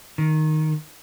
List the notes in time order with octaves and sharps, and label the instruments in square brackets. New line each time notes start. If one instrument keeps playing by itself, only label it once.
[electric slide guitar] D#3